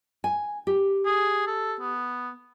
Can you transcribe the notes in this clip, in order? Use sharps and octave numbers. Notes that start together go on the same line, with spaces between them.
G#5
G4
G#4
A4
B3